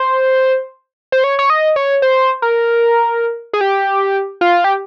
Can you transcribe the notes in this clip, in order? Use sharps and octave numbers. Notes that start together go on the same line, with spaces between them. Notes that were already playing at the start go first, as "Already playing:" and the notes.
Already playing: C5
C5
C#5
C#5
D#5
C#5
C5
A#4
G#4
G4
F4
G4